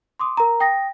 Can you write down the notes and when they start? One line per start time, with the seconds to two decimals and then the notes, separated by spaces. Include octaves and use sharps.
0.19 C6 D6 D#6
0.37 A#4 A#5
0.60 G5 D#6 A#6